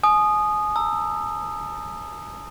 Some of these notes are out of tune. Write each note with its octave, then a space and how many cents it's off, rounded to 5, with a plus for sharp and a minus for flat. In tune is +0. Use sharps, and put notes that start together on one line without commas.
G#5 +35 D#6 -10
A#5 -40 E6 +0